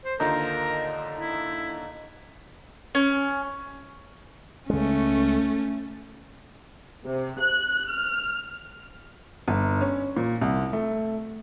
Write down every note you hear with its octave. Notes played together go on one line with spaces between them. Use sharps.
C5
D#2 D3 D#4 F4 A#4
E4
C#4
C#2 G#3 A3 C#4
C3
F#6
F6
G1
C#4
A#2
C2
A3